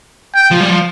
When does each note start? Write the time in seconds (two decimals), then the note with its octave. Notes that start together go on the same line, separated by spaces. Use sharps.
0.35 G5
0.51 F3
0.60 G3
0.69 F3